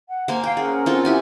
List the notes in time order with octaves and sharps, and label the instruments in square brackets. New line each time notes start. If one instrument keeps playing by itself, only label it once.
[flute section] F#5
[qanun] A#3 C5 G#5
[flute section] F5 [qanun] G5
[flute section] C#4 A#4 F#5 [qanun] G#4
[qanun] C4 F4 A4
E4 G4 G#5